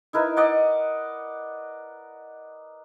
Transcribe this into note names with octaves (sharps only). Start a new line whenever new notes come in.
D#4 E4 A#4 B4
D5 D#5 F#5